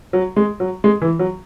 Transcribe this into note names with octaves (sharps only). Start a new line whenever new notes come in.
F#3
G#3
F#3
G#3
E3
F#3